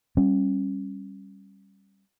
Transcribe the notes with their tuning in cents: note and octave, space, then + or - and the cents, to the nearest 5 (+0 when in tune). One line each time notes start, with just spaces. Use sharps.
G3 +0 C#4 -20